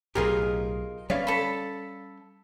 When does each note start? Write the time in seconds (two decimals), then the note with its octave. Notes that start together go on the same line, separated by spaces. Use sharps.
0.15 B1 A2 D#4 F4 G4 G#4 A#4
1.10 G3 C4 C#4 B4 C#5 D5 F5
1.27 A4 A5 B5